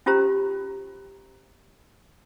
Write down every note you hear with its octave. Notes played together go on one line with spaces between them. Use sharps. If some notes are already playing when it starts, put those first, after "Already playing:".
C#4 F4 G4 C5 A#5